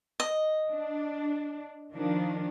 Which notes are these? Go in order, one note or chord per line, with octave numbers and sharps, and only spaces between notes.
D#5
D4
D#3 F3 D4